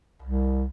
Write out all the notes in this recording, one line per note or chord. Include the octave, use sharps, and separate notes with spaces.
C2